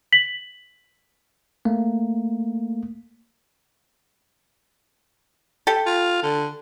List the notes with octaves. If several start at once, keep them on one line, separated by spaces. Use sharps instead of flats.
B6 F#7
A3 A#3
G4 A4
F4
D3